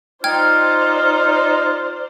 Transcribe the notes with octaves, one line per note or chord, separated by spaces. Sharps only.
D#4 F4 C5 D5 G5 F6 G#6